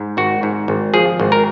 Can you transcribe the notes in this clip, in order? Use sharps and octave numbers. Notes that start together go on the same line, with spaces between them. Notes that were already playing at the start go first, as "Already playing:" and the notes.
Already playing: G#2
G#1 F#4
G#2
G#1
F3 G#4
G#1
A#4